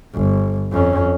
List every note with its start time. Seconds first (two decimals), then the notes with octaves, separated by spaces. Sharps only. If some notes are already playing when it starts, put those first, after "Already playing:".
0.15 G1
0.72 F2 C#4